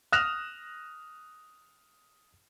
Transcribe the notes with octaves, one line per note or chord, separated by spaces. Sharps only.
D#6 F6 F#6 A#6 E7 F7